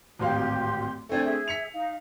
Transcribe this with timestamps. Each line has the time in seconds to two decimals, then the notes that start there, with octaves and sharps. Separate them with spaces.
0.19 D1 G#1 G4 F5 C6
1.09 A3 C4 D4 D5 G#5 G#6
1.24 G#4 E5
1.48 B6 C#7 F7
1.73 D#4 F5